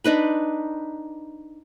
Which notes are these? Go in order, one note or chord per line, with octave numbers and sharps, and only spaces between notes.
D4 D#4 B4 B5